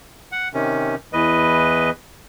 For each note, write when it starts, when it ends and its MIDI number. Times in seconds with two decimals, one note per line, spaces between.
0.32 0.48 78
0.54 0.95 48
0.54 0.95 51
0.54 0.95 61
1.13 1.90 40
1.13 1.90 52
1.13 1.90 71
1.13 1.90 75